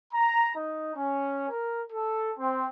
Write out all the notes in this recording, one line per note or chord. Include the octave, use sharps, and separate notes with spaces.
A#5
D#4
C#4
A#4
A4
C4